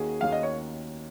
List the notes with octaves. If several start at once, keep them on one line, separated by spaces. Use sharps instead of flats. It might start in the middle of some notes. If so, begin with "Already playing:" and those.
Already playing: D#2 D#3 A#3 C#4 F#4 G#4
D#2 D#3 A#3 C#4 F#4 F5
D#5
C#5